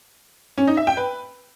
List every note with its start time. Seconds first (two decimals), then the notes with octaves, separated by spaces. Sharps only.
0.58 C#4
0.67 D#4
0.77 E5
0.87 G5
0.97 B4